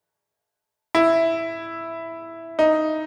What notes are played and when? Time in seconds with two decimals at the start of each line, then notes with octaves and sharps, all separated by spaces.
0.95 E4
2.59 D#4